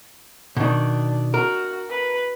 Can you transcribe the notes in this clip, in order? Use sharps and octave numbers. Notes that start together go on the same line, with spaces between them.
B2 D#3 D4
F#4 A#4
B4